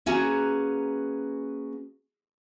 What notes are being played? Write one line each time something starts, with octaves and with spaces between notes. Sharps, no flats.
A#3 C#4 F#4 G#4 B4 A#5